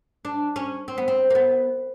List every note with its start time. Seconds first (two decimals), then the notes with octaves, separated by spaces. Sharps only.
0.25 D4
0.56 C#4
0.88 C4
0.98 B3
1.08 C4
1.30 A#3
1.35 B3